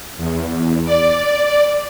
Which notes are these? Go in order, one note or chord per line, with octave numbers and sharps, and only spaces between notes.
E2
D5